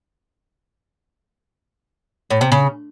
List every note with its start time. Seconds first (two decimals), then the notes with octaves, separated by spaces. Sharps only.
2.30 A2
2.41 C3
2.52 C#3